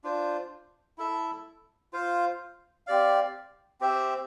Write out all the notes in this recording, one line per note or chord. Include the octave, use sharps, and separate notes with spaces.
D4 F4 C5
E4 A4 E5
F4 C5 F5
C4 G4 D5 F5
C4 G4 C5 E5